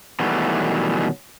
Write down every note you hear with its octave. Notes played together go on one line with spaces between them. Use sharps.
B2 D#3 E3 F#3 G3 A3